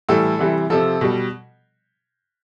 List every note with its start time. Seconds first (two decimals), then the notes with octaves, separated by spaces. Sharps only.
0.09 A2 E3 G3 A4
0.39 C3 E3 G3
0.70 C3 F3 A4
1.01 B2 G3